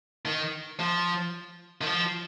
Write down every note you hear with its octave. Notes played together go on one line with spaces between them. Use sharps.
D#3
F3
D#3
F3